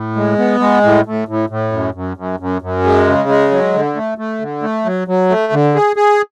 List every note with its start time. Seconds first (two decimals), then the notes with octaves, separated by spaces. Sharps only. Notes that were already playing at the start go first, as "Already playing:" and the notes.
Already playing: A2
0.16 G#3
0.38 B3
0.60 G#3
0.83 A2
1.06 A2
1.28 A2
1.50 A2
1.72 F#2
1.94 F#2
2.17 F#2
2.40 F#2
2.62 F#2
2.84 G#3
3.07 C#3
3.29 G#3
3.51 F#3
3.73 D3
3.95 A3
4.18 A3
4.40 D3
4.62 A3
4.85 F#3
5.08 F#3
5.29 A3
5.52 D3
5.75 G#4
5.96 G#4